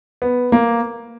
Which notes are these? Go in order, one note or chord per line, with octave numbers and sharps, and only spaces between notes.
B3
A#3